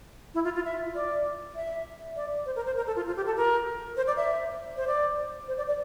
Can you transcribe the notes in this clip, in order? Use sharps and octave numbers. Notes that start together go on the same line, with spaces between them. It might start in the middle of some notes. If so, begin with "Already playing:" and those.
E4
F4
F4
E5
D5
E5
D5
C5
A#4
C5
A#4
A4
F4
F4
G4
A4
A#4
C5
D5
E5
C5
D5
C5
D5
D5